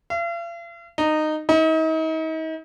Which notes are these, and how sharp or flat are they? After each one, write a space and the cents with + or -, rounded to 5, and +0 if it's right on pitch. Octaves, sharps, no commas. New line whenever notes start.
F5 -45
D#4 -15
D#4 +40